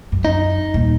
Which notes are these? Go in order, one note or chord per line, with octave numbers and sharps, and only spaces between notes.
F#2
D#4
D#1